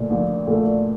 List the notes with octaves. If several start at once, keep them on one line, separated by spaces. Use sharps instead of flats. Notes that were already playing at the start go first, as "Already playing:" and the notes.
Already playing: A#1 A#2 A3
A#1
A#2 A3